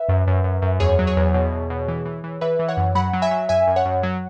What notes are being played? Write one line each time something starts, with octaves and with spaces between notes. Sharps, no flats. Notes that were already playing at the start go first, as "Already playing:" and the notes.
Already playing: B4 E5
F#2
F#2
F#2
F#2
E2 G#4 C#5
F#3
G#4 C#5
E2
B2
E2
B2
E3
E3
E3
E3 B4 E5
E3
C#5 F#5
F#2
F#3 F#5 B5
F#3
E5 G#5
F#3
F#2 E5 G#5
F#2
C#5 F#5
F#2
F#3